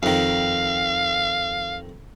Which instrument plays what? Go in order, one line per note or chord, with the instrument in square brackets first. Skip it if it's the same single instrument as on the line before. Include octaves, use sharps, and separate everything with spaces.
[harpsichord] F2 D#3 [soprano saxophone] F5